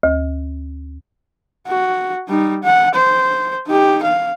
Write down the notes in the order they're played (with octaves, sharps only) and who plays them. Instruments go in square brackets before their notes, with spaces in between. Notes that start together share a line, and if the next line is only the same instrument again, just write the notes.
[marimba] D2
[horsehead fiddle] F#4
G3 D#4
F#5
C5
D#4 G4
F5